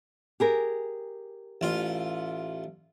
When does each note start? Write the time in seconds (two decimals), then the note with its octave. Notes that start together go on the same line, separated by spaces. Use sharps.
0.40 G4 G#4 A#4
1.61 A1 F4